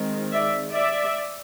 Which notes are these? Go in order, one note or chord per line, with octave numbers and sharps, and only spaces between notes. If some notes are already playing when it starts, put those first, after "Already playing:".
Already playing: D#3 G#3 C4
D5 E5
D5 E5